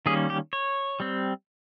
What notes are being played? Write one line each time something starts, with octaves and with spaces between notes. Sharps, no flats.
D#3 G3 A#3 C#4 G#4
G4
C#5
G3 C4